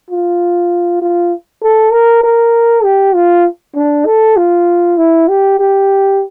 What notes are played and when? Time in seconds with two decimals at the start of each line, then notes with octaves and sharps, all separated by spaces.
0.10 F4
1.02 F4
1.63 A4
1.92 A#4
2.24 A#4
2.84 G4
3.14 F4
3.76 D4
4.06 A4
4.37 F4
4.98 E4
5.29 G4
5.59 G4